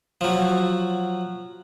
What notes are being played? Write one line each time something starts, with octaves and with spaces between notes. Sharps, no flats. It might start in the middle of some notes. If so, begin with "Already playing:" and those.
F3 F#3